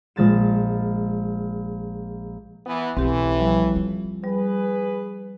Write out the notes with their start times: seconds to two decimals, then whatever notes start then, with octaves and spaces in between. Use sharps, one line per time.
0.16 A#1 G#3 A6 E7
2.66 E3 B3
2.97 B1 A2 E3 C4 G4
3.40 F3 G3
3.76 F4
4.24 G3 G#4 B4